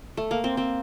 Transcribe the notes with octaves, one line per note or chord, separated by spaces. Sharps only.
A3
A#3
C4
C4